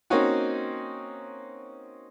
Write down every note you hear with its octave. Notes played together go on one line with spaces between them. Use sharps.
A#3 C4 C#4 D#4 F#4